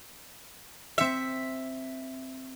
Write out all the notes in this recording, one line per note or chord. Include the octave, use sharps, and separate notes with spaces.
C4 E5 C#7